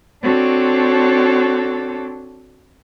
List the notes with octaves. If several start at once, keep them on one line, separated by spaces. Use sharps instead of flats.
C4 D4 F#4 A4 C#5